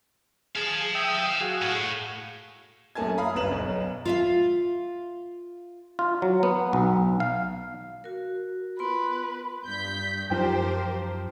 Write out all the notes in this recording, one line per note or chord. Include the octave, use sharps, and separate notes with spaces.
G#4 F5 A5
E5 G5 D#6
F#4 G#4 F5
A2
F#2 A#2 A3 G#5 A5 G#6
F5 A#5 B5 D#6
G1 F#2 B4 E7 F#7
B1 B2
F4 E5 F5
F4
F#3
B3
B1
F5
F#4 A#4
B3 F4 B4 C6
G2 G6 B6
F#2 F3 G4 A#4 C5 G5